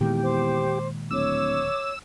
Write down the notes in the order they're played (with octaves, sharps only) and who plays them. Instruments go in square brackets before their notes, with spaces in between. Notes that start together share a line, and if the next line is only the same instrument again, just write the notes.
[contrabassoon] E2 [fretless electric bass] A#2 D#3 G#3 [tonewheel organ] G4
[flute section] C5 D6
[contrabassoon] D1 [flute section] C#5 D6 [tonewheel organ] E6